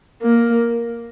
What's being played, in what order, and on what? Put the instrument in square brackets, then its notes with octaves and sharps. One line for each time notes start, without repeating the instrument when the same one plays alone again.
[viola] A#3